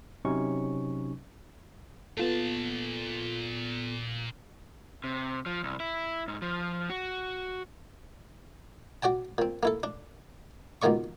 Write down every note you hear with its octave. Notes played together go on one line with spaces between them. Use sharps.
C3 F#3 C#4 D#4 C#6
A#2 B3 F4 A4 A5
C3
F3
C2
E4
G#2
F3
F#4
F#4 D5 G5 A5
A#2 C4
A#3 E4 A4
D4
C#2 B2 D#3 A#3 D5 C#6